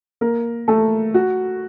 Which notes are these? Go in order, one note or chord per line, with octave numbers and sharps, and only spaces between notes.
A#3 A#4
A3 A4
F#4